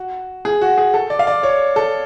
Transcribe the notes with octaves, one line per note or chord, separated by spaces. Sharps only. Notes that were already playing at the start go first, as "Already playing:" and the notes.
Already playing: F#4
G#4
F#4
G#4
A4
D5
F5
D5
C#5
A4